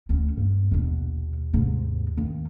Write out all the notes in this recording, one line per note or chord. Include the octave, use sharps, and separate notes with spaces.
D2 C#4
G2 A#3
A#1 D#2 B2
G#2 C3
D#3 A#3